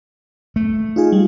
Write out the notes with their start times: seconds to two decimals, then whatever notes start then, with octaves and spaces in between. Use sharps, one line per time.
0.56 A3
0.96 D#4 F4 G#4
1.12 G3